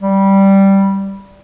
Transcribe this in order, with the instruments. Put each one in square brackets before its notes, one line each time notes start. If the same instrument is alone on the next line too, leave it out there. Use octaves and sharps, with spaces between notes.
[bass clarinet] G3